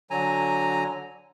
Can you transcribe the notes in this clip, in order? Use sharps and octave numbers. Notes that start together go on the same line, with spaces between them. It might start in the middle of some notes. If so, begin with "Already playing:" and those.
D3 F#3 G#5 A#5